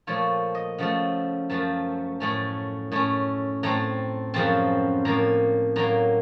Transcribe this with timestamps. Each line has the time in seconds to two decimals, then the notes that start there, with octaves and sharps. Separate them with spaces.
0.07 A#2 F3 A3 C#5
0.55 D#5
0.78 C#3 F3 A3 F#5
1.50 F#2 F3 A3 A5
2.20 A2 A3 C#4
2.92 A2 A3 C#4
3.63 A2 A3 C4 A#5
4.34 F#2 C#3 F3 C4 A5
5.05 A2 F3 A#3 A#5
5.76 A2 F#3 A#3 A#5